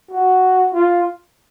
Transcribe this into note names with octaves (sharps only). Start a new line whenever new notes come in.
F#4
F4